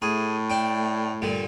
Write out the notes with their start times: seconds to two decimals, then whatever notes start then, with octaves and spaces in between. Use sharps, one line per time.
0.02 A2 A3 G#4
0.50 D4 G5
1.22 G2 A#2 D3